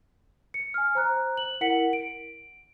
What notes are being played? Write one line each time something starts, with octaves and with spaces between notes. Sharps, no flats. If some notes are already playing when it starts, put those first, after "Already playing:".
C#7
G#5 F6
C5 A#5 F#6
F#7
E4 A#4 F#5 B6 C#7 F#7
D7